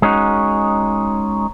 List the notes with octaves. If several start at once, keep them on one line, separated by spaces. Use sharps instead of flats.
G#3 C#4 D#4 F#4